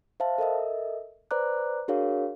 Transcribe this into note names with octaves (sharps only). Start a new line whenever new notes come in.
C5 E5 F5 A5
A4 A#4 D#5 E5
B4 C5 D5 A#5 D6 F#6
D4 F#4 G#4 A#4 C#5 F5